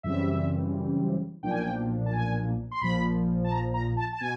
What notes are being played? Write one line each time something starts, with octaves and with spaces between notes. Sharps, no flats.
F#2 C#3 E3 G3 C4 E5
B1 A#2 F3 A#3 D4 G5
G#5
G5
A5
G#5
C6
A#1 A#2 F3 B5
A5
A#5
A#5
A5
A5
B2 G#5